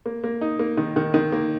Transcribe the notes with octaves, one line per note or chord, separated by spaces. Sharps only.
A#3
A#3
D#4
A#3
D#3
D#3
D#3
A#3